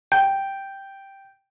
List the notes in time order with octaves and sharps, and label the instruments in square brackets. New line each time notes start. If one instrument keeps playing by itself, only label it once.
[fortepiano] G5